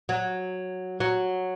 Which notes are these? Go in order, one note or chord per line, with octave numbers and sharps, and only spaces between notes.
F#3
F#3